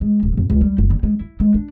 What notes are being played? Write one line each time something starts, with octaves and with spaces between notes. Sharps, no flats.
G#3
D1
F2
C#2
G3
F#1
D3
G#3
E4
G#3
D4